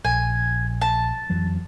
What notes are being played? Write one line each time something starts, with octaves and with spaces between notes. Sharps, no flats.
A#1 G#5
A5
F2 E3 F#3